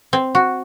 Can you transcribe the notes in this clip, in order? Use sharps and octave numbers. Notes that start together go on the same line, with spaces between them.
C4
F#4